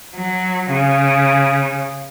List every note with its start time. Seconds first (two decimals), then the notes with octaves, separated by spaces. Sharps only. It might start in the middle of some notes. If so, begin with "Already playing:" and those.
0.17 F#3
0.72 C#3